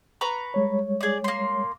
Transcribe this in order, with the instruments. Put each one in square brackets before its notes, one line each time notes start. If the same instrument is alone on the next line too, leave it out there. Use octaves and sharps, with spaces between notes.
[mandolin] B4 A#5 C#6
[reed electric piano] G3 G#3 C#5
[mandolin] G#4 D5
A#3 C6